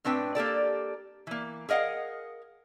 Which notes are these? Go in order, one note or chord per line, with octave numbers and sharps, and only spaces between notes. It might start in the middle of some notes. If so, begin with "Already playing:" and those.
A2 C4 D4 B4 G5
A#3 G4 A4 D5
E3 A#3
G#4 A#4 D#5 F5 F#5